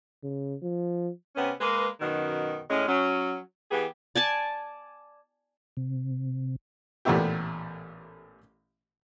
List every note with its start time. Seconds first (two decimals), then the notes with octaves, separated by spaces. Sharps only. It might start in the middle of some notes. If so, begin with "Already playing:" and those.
0.23 C#3
0.62 F3
1.36 C3 B3 C#4
1.60 G#3 A#3 B4
2.01 F#2 B2 D#3
2.68 A2 G#3 C#4
2.87 F#3 C#4
3.71 E3 B3 G4 G#4
4.16 D5 G#5 A5
5.77 C3
7.05 A1 A#2 A3 B3 E4 G4